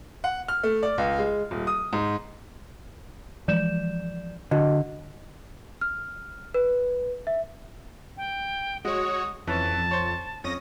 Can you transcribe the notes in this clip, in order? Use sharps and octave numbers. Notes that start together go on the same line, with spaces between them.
F#5
F6
A3
D5
C#2
G#3
D#1
D#6
G#2
E3 F3 G#3 D5 G6 E7
D3 F#4 D#5
F6
B4
E5
G5
G#3 F#4 C#5 D#6
F2 E3 C#4 A5
C5 C#5
F2 C#4 D#6 A#6